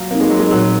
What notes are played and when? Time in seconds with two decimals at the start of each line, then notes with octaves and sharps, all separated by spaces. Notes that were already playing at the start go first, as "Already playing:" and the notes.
Already playing: F#3 F4
0.11 A#3 C4 D#4
0.20 G#3
0.30 F#3
0.39 G#3
0.51 A#2 F#3